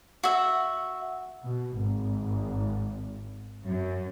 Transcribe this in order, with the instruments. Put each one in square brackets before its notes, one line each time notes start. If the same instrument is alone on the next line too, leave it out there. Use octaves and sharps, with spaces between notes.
[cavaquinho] F#4 E5
[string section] B2
G#1
F#2